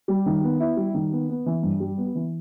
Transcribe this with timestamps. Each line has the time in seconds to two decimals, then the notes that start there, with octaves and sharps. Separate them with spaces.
0.08 G3
0.26 D#3
0.44 B3
0.60 E4
0.77 G3
0.94 D#3
1.12 B3
1.30 B3
1.46 E3
1.63 G2
1.80 G3
1.98 B3
2.15 E3